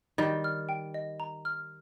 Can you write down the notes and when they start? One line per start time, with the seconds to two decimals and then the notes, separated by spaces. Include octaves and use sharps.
0.18 D#3 G3 D#5
0.44 F6
0.69 G5
0.94 D#5
1.20 A#5
1.45 F6